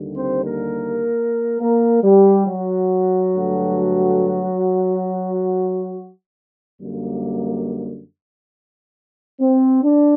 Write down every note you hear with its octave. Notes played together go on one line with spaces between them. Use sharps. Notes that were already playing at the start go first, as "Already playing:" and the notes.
Already playing: D#2 D3 G3
C4 C5
A#3 A#4
A#3 A#4
G3 G4
F#3 F#4
G2 D3 A3
F#2 D3 G3 A#3
C4
D4